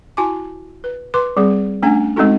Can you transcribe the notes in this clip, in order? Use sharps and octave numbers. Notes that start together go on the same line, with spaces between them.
E4 F#4 G#5 A5 D6
B4
B4 C6 D6
G3 C4 G#4
A3 C#4 D4 F#5 G#5
G#3 C4 C#4 D#4 F#4 A4